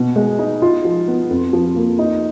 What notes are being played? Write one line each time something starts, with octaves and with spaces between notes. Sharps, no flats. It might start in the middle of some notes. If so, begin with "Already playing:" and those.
Already playing: B2
G#3
D#4
F4
F3
B3
F2
F3
A#3
D#4